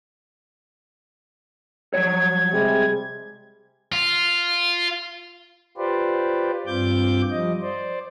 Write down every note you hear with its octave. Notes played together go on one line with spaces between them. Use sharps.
F3 F#3 C#5 G#6
C3 G3 G#3
F4
F4 G4 B4 C5 D5
G2 C4 F4 D6 G6
F3 G3 D#5
C5 D5